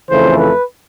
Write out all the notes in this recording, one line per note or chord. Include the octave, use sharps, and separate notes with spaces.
F2 C#3 E3 A3 C5
B4